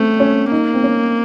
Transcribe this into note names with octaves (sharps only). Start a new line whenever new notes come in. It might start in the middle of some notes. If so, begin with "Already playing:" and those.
Already playing: A3 C4 C#4
C#4
A#3 D#4
C4
C#4